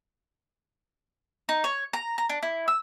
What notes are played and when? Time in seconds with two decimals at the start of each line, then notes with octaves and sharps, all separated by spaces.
1.49 D#4
1.64 C#5
1.93 A#5
2.18 A#5
2.29 D4
2.43 E4
2.68 E6